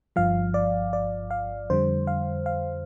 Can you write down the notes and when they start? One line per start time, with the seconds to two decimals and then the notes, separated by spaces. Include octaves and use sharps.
0.16 G1 G2 F3 F5
0.54 D5
0.93 D5
1.31 F5
1.70 F2 D3 G3 C5
2.07 F5
2.46 F5